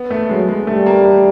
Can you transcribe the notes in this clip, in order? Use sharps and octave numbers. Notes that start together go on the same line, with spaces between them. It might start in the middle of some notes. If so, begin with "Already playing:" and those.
Already playing: B3
A3
F#3 G#3
G#3
G3 A3
A#3
A3